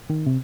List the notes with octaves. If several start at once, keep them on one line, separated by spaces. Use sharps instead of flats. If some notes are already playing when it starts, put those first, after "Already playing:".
D#3
C3